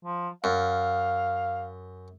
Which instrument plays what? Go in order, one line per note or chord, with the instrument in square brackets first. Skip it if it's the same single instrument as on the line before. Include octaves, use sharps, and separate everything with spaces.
[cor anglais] F3
[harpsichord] F#2 [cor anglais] F5